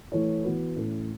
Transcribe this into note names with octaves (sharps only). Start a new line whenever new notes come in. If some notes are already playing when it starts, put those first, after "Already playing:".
E3 A3 E4 C#5
E3 B3 F#4 B4
A2 E3 A3 C#4 A4